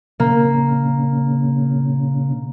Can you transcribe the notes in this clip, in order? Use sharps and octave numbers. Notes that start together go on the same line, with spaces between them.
A#2 C#3 A#3